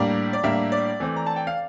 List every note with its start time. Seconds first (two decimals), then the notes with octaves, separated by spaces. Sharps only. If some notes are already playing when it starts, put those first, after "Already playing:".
Already playing: A2 G3 A#3 D4 A#5 D6
0.33 D5
0.43 A2 G3 A#3 D4 E5
0.72 D5
1.00 E3 A3 C4
1.16 A#5
1.27 A5
1.36 G5
1.47 F5